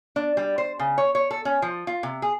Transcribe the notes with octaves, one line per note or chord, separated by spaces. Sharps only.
D4
G3
C5
C#3
C#5
C#5
A4
C#4
F3
F4
C3
G#4